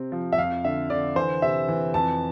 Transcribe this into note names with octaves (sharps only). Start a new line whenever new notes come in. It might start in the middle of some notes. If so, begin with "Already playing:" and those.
Already playing: C3 C4
F3
E5
F2 F5
D3 E5
D3 D5
E3 C5
C3 E5
E3
F2 A5